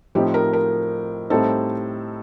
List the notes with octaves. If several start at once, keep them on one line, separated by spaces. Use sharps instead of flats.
A2 F3 C4 D#4 G4
A#4
A#4
A2 G3 C4 D#4 A4